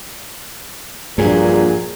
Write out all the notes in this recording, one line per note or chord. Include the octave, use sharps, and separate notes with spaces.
A#1 G2 A#2 F#3 G#4